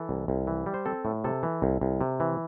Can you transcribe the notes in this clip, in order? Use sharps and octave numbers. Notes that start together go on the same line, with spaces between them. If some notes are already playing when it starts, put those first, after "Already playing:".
Already playing: E3 A4
C2
C2
E3
G3
C5
C4 A4
A2
C3 A4
E3
C2
C2
C3
E3